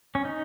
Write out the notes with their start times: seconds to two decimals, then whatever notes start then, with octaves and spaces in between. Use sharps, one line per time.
0.15 C#4
0.25 D#4